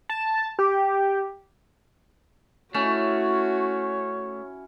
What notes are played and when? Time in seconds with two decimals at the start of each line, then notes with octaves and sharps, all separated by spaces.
0.09 A5
0.59 G4
2.74 A3 C#4 E4 F#4 C#5